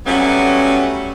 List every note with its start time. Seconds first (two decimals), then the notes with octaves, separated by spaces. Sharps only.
0.06 F#3 G3 A3 B3 C#4